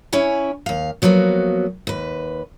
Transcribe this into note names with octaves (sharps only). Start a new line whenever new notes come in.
C#4 E4 C#5 G#5
D#2 F5
F3 F#3 A#3 B3 F#4
D#2 B4